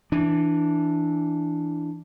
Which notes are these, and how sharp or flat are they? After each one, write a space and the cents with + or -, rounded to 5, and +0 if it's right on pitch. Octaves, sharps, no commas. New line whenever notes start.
E3 +0 D4 +0